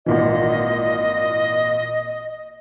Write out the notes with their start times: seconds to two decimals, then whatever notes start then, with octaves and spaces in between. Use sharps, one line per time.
0.06 G#1 A#2 E3 D#5